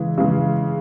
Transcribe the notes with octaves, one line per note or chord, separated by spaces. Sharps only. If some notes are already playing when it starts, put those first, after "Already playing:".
Already playing: C#3 E3 G#3
C#3 E3 G#3